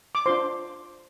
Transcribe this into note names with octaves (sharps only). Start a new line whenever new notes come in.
D6
D4 F4 C5 C6